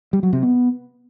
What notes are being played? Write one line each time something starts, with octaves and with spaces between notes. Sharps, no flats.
G3
F#3
C3
B3